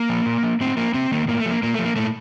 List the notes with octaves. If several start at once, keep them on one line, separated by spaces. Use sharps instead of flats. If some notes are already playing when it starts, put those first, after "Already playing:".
Already playing: A#3
F3
A#2
F3
A2 C4
F3 A#3
C3 C4
D#3 A#3
A2 A#3
A3
F3
A#3
A#2 A#3
F3 A3
A#3
A#2 A3